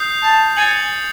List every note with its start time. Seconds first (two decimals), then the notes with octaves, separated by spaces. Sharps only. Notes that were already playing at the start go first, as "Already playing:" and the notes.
Already playing: D#6 G6 C7
0.23 A5
0.57 G#5 A6 C#7 F#7